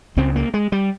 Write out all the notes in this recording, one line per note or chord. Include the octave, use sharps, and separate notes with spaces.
C#2 C#3 C4
A#3
G#3
G3